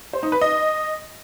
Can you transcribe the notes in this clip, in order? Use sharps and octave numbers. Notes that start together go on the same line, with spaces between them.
C5
D#4
B4
D#5